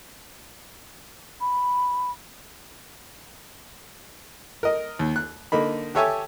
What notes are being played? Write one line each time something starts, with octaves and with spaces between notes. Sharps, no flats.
B5
A#4 D#5
D#2
F#6
D3 A#3 D#4 B5
G4 A4 C#5 E5 G#5 C#6